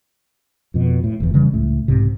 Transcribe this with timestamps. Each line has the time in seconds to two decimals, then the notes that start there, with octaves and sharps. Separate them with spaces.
0.74 F2 B2
1.04 A2
1.20 F1 E2
1.34 C#3 E3 G3
1.53 C#2 A2 C#3 A3
1.88 B1 G#2 C3